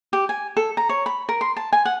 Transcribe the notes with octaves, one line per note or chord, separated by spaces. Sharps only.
G4
G#5
A4
A#5
C#5
B5
A#4
C6
A5
G#5
F#5